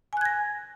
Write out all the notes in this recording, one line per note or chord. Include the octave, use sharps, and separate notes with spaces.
G#5 F#6 G#6 A#6